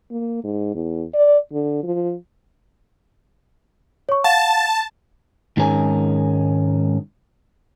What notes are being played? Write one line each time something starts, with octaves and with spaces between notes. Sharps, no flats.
A#3
G#2
E2
D5
D3
F3
C#5 C#6
F5 F#5 A5
G#2 D#3 G#3 C#4 A#4 G#5